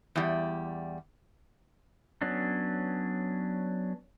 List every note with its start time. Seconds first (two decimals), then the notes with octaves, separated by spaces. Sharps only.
0.16 E2 G3
2.22 F#3 B3 C#4 D4